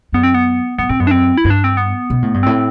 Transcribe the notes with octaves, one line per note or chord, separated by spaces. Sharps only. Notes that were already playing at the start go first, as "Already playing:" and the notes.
F#2 B3
C4
B3
G2 B3
A2 C4
F#2 B3
D4
C4
E4
G2
D4
C4
B3
B2
A2
G2
A2 C4